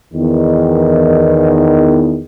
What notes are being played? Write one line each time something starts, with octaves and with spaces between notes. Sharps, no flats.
E2 D#3